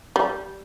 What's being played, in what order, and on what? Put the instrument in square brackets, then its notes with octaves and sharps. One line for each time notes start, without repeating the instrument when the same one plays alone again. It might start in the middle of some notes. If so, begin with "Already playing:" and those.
[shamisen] G3